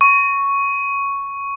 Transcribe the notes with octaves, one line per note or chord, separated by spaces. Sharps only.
C#6